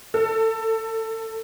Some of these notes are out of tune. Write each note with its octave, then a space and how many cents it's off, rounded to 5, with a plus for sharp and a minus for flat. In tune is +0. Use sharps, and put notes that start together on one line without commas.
A4 +25